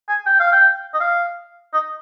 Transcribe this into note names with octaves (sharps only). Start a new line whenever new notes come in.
G#5
G5
F5
G5
D#5
F5
D#5